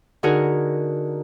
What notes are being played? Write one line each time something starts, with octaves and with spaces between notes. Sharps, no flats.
D3 D#4 F#4 G#4 A#4